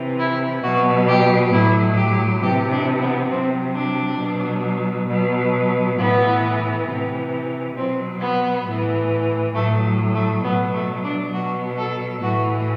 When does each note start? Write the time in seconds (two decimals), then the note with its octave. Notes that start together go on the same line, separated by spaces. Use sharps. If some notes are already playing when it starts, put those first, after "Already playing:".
Already playing: C3 E3
0.18 E4
0.63 B2 F#3 F#4
1.07 G4
1.52 A2 F#3 E4
1.97 G4
2.41 C3 E3 G4
2.71 D4
3.00 B3
3.30 C3 F#3 C4
3.75 D4
4.20 B2 F#3
5.09 B2 F#3
5.97 A2 E3 B3
6.87 C3 E3
7.76 B2 F#3 C4
8.20 B3
8.65 A2 E3
9.54 A2 F#3 A3
10.14 A3
10.43 B2 F#3 B3
10.73 A3
11.03 D4
11.32 B2 F#3 F#4
11.77 A4
12.22 A2 E3 F#4